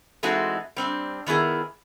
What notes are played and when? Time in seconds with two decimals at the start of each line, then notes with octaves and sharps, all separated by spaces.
0.23 E3 G#3 A3 C4 D#4 F#4
0.76 G3 C4 D4
1.26 D#3 B3 E4 G#4 A#4